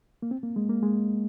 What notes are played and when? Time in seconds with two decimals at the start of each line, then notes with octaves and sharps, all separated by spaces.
0.22 A#3
0.31 C4
0.43 A#3
0.56 G#3
0.70 A#3
0.83 G#3